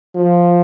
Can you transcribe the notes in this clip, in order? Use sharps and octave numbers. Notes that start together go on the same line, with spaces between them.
F3